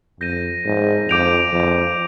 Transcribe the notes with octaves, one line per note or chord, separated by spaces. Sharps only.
F2 G6 A#6 D#7
G#2
F2 D6 G6 D7 F7
F2